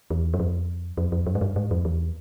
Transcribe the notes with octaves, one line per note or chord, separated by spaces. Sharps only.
E2
F#2
F2
F2
F2
F#2
G#2
G2
G#2
F2
E2